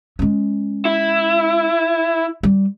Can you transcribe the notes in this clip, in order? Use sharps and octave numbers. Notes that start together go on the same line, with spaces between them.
G#3 C#4
E4
G3